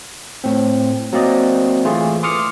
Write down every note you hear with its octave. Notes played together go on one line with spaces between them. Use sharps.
A2 C4
F#3 A#3 C4 D5 D#5
E3 A3 E4 F4 G#4
C6 D6 D#6 F6 C#7